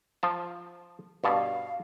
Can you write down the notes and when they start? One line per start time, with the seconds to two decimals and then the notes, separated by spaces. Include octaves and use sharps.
0.23 F3 F5 A5
1.24 G2 B2 F5 A5